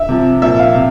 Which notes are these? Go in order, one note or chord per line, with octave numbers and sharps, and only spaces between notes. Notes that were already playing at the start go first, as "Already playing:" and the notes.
Already playing: E5
C3 F3
A#2 F3 E5
F5
C3